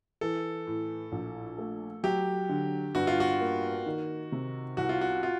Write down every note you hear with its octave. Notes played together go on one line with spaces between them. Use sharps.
E3 A4
A2
A#1
A3
F#3 G4
D3
G2 F#4
F4
F#4
A#3
D#3
C3
C2 F#4
F4
F#4
F4